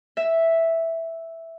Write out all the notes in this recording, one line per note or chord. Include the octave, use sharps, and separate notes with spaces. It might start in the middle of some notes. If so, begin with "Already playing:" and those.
E5